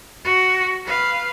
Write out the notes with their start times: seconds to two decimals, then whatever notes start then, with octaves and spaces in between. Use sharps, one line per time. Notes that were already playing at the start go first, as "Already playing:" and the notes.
0.24 F#4
0.86 B4 F5